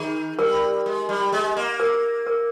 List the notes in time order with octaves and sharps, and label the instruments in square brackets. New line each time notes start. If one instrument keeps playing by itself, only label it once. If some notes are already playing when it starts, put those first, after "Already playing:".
Already playing: [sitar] D#3 [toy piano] G#4
[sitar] G3 [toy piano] A#4
[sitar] G#3
G3
G#3
A#3
[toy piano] A#4
A#4